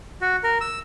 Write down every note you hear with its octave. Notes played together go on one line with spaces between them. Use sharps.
F#4
A#4
E6